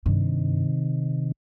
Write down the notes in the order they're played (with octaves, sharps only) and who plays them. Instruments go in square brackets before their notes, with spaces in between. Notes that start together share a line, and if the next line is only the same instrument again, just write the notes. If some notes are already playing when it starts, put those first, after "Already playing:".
[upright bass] G2 [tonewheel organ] C3 D#3